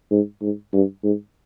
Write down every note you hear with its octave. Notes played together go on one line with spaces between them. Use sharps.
G#2
G#2
G2
G#2